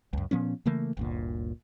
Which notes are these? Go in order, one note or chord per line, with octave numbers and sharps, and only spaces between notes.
C#2 F#2
A#2 F3 B3 C#4
C#3 E3 A3 A#3
G1 D2 A#2